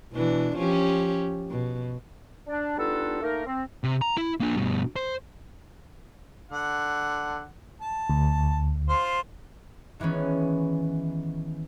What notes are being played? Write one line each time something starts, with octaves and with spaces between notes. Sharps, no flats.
B2 E3 D4
F3 C#4 G4
B2
D4
G3 B3 D4 D#4 F4 A4
A3 A#3 D#4 A#4
C4
C3
A#5
E4
A#3 D4
G2 B2
C5
D3 F#5
A5
D2
F4 C5
D#3 E3 G#3 B3 C#4